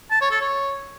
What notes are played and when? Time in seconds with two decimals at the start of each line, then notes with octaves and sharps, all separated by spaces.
0.11 A5
0.21 C#5
0.31 A4
0.41 C#5